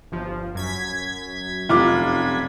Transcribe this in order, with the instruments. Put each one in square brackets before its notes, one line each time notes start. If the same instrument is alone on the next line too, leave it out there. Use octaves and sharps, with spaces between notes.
[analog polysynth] G1 F3
F#2 G#6 B6
[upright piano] F1 F4 D6